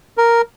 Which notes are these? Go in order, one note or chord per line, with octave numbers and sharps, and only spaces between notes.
A#4